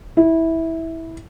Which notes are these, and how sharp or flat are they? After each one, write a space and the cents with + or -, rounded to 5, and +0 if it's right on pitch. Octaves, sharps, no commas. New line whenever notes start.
E4 -15